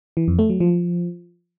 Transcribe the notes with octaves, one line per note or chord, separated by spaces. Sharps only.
E3
F2
A3
F#3
F3